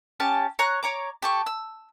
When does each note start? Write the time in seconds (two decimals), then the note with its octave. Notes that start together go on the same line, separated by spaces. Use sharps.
0.20 C#4 G4 A5
0.59 C#5 A#5 F#6
0.83 C#5 A#5 D6
1.22 G4 A4 C#6
1.46 E6